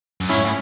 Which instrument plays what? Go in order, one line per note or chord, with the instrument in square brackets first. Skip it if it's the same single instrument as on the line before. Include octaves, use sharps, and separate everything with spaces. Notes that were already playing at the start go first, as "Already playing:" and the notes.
[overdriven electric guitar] F#2
[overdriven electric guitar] G#2 [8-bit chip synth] C#4 E4
[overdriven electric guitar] A2